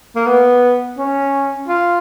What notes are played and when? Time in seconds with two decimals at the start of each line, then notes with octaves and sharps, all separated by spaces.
0.16 A#3
0.27 B3
0.98 C#4
1.68 F4